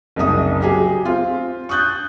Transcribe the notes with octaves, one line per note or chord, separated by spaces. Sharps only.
F#1 C2 D#4 E5 D#6
F#3 G4 G#4
C4 F4
C#6 D#6 F#6 G6 A6